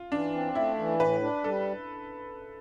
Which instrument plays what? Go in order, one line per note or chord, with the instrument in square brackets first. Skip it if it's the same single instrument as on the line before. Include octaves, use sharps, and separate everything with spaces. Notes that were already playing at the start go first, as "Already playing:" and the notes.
Already playing: [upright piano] F4
[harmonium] E3 [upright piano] D4
[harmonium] C4
[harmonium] A3 [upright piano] E4
[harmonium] E3
[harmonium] A2 [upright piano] B4
[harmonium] D4
[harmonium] G3 [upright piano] A4